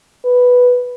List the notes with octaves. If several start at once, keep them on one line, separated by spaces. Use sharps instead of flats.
B4